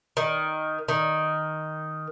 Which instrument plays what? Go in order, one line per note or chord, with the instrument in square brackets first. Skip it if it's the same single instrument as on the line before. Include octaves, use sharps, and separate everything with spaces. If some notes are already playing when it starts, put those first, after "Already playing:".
[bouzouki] D#3
D#3